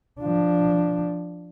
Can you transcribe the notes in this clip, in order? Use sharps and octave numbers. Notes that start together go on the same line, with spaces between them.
F3 D4